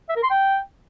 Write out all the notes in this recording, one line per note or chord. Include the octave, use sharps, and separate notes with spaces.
E5
A#4
C6
G5